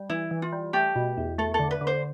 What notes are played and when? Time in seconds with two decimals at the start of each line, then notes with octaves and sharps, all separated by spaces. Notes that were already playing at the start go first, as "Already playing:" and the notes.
Already playing: G3
0.10 E3 E4
0.31 E3
0.42 F4
0.52 G3
0.73 A3 G4
0.96 B2
1.17 E2
1.38 A3 A4
1.54 A4
1.59 D3
1.71 B4
1.81 D3
1.87 C5